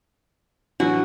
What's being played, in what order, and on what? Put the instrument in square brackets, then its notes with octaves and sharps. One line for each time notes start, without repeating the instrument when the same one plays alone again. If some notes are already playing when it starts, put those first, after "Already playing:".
[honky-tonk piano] A2 E3 F#3 [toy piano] D4 [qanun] F#4